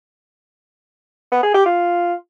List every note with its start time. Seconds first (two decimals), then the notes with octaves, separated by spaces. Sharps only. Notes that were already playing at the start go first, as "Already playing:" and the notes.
1.32 B3
1.43 G#4
1.54 G4
1.66 F4